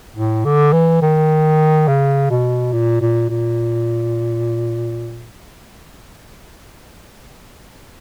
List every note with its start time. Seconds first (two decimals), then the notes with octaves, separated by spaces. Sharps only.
0.16 A2
0.45 D3
0.73 E3
1.02 D#3
1.88 C#3
2.30 B2
2.73 A#2
3.01 A#2
3.29 A#2